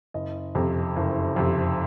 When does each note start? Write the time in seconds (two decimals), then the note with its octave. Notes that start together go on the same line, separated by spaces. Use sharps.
0.14 F#1 D#5
0.55 F2 C3
0.96 F#1
1.36 F2 C3